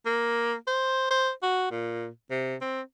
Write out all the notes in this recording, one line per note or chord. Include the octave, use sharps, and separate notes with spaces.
A#3
C5
C5
F#4
A#2
C3
C4